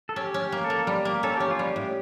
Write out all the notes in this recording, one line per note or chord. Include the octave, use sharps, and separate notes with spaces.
A4
C#4 G4
C#4
G4
A#3
A4
A#3
G3 G4
A#3
C#4 A4
C#4 G4
F4
G3 G4
A2